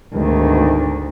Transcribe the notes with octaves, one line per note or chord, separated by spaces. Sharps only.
D2 G#2 B2 D#3